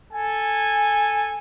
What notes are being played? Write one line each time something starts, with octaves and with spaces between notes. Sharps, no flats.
A4 G#5